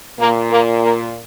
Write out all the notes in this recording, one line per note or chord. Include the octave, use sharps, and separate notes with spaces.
A#2 A#3
A#3
A#3